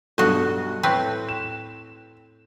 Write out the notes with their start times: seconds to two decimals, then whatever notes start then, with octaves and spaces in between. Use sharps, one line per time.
0.18 B1 G2 F#4 A4 D#5
0.83 A2 C4 B4 C#6
1.29 E7